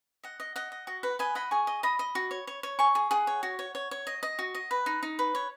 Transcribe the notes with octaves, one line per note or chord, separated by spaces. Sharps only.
D#5 F#5
D#5
D#5 F#5
D#5
F#4 D#5
B4 F#5
B4 D#5 G#5
D#5 F#5 B5
G#4 G#5 C#6
D#5
D#5 B5 D#6
D#5
F#4
C#5
C#5
C#5
G#4 G#5 C#6
G#4
G#4 F#5
C#5
F#4
C#5
C#5
C#5
D#5
D#5
F#4
D#5
B4
D#4
D#4
B4
C#5